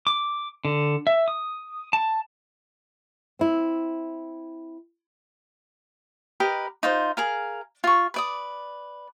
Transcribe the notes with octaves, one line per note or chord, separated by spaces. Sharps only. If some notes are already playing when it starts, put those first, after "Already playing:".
D6
D3
E5
D#6
A5
C4 E4
G4 A#4 B4 D#5
D#4 F4 C5
G#4 A#4 F5
F4 C#6
B4 D5 D#6